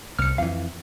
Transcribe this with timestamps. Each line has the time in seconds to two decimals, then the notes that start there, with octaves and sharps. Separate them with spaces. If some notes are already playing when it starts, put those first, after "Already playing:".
0.19 C2 F6 C#7
0.38 F2 E3 F5